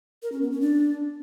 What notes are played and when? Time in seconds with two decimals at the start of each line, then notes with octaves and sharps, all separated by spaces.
0.23 A#4
0.32 C#4
0.42 B3
0.51 C#4
0.61 D4